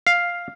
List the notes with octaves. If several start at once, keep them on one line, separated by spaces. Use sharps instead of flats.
F5